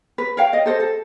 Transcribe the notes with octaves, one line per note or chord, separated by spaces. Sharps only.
B4
A#4 C#5 F5 G5
D#5
A4 C5 D#5
A4